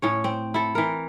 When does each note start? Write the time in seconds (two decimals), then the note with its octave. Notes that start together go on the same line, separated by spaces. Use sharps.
0.02 A2 C#4 C#5
0.24 C4
0.54 E4 A4
0.75 E3 A#4